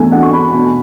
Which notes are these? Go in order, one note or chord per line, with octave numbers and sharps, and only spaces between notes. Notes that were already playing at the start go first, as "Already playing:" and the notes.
Already playing: E2 A3 D4 G#5
D4 F#5
C#6
D4 B5
B2